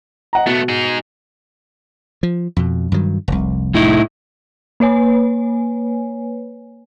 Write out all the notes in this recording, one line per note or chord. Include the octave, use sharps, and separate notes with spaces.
D#5 F#5 A#5
B2 A3 B3
D#4 G#4
F3
F2 B2
G2 D#3 F#3
F1 C2
A2 D#4 E4
A#3 B4 C#5 G#5